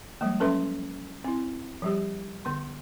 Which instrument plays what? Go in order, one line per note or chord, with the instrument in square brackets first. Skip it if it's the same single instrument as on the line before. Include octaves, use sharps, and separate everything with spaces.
[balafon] F3 G3 G#3 A#3
F#3 C#4 A4 B4 E5 C6
C4 E4
F3 G3 G4
D3 B3 C6